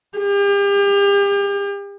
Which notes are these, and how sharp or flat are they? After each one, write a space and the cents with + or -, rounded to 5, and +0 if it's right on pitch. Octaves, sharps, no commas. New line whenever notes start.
G4 +40